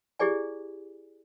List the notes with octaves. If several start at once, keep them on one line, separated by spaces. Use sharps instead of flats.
E4 G4 G#4 D5 G#5